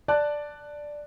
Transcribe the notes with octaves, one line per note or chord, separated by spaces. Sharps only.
D5 A5 F#6